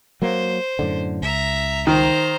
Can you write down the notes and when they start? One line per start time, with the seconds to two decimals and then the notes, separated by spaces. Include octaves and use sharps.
0.22 F#3 A#3 C5
0.79 F#2 A2 D3
1.22 C#2 E5 A#5
1.87 D#3 C5 A#5